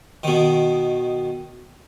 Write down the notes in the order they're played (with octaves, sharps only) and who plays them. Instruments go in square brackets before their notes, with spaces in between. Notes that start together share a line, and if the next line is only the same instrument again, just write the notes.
[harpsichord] B2 D#3